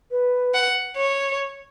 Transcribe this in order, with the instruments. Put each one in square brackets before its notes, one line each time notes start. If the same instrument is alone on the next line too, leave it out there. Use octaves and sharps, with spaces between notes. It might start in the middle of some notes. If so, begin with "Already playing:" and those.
[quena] B4
[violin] F#5
C#5